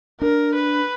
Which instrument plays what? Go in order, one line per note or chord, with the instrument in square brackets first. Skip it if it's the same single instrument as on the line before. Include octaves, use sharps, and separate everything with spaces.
[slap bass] D4 [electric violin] A#4
[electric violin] B4